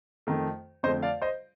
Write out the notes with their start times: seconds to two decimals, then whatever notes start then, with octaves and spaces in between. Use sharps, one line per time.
0.27 F2 D#3 A3
0.83 F2 D3 A3 C5 D#5
1.03 D5 F5
1.22 C5 D#5